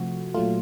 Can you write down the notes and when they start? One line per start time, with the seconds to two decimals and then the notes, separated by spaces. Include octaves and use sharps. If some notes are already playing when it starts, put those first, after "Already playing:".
Already playing: C3 F3 A3 F#4
0.34 A#2 F#3 A3 F4